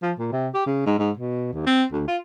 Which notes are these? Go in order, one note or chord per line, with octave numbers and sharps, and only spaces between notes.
F3
A#2
C3
G4
C#3
G#2
G#2
B2
D#2
C4
D2
F4